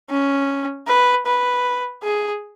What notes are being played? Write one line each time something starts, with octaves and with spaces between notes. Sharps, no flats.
C#4
B4
B4
G#4